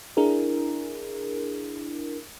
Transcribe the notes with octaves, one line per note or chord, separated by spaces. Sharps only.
D4 E4 G#4 A#4